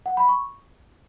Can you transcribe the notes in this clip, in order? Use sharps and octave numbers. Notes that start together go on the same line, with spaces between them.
F#5
B5
C#6